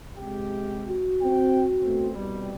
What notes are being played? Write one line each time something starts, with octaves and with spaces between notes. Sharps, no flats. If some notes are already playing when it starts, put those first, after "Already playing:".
C3 G#3 G4
F#4
C4 G5
B2 A3 C4
C2 B2 G3